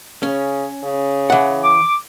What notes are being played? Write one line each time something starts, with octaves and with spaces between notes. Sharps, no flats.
C#3 C#4
C#3
E3 F#5
D6